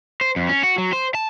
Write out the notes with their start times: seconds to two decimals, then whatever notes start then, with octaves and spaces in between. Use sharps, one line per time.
0.21 C5
0.36 F2
0.49 C#4
0.63 F#4
0.78 F#3
0.93 C5
1.15 A5